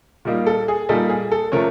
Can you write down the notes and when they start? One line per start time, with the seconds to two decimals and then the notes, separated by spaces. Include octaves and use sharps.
0.25 A#2 G3 A#3 D#4
0.47 A4
0.68 G#4
0.89 A#2 G3 A#3 D#4 A4
1.09 G#4
1.31 A4
1.52 C3 F3 A3 C#4 A#4